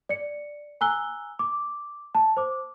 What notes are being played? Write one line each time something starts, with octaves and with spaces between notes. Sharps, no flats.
D5 C#7
G#5 A#5 E6 F#6 G7
D6
A5
C5 D6